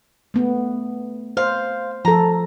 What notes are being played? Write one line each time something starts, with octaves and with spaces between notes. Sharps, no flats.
A3 B3
C5 F5
F3 A4 A#5